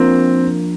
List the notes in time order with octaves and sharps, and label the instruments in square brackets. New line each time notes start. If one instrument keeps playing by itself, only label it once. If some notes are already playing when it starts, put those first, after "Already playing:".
Already playing: [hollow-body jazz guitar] F3 A#3 D4 F4 A#4 [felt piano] C4